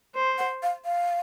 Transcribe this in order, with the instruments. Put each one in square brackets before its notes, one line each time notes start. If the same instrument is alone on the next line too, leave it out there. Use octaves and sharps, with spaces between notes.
[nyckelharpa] C5
[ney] F#5
F5
F5